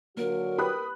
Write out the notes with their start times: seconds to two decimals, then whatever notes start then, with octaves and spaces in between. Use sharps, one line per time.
0.17 D3 F#3 A#3 F#4 A#4
0.59 G4 B4 B5 D#6 F#6